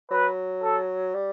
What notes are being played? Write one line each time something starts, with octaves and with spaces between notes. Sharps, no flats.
F#3 B4
A4
G3